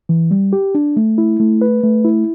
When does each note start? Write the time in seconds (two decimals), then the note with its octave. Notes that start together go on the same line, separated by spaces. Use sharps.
0.09 E3
0.31 G3
0.53 G4
0.75 D4
0.97 A3
1.18 E4
1.40 A3
1.61 B4
1.83 A3
2.05 E4